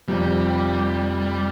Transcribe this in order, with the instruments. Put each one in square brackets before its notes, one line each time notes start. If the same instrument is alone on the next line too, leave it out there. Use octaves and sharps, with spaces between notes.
[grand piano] F1 F2 C3 F3 [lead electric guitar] G3